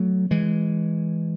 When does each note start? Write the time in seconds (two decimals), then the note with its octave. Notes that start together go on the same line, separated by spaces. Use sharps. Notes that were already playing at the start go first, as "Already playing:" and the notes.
Already playing: F#3 A3
0.31 E3 G#3